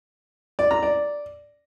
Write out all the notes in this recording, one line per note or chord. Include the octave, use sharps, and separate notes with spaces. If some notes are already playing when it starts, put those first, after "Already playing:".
D5
A#5
D5